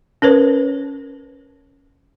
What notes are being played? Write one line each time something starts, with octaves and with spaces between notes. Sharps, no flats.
C#4 A#4 B4 C#5